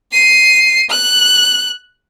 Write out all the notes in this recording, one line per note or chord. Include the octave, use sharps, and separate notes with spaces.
C7 D#7
F#6